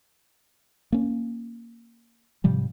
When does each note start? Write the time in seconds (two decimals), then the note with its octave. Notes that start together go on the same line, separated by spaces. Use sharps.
0.92 A#3 C#4
2.44 G#2 C3 F3 G3